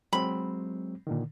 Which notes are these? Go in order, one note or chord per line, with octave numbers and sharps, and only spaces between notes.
F#3 G#3 C4 B5
A#2 D3 D#3